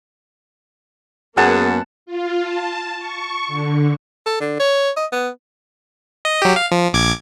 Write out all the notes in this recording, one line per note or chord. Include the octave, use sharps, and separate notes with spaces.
F#2 A#3 B3 G#4 F#5 A5
F4
A5
C#6
D3
A4
D3
C#5
D#5
B3
D#5
F#3 G4
F5
F3
A#1 D6 G#6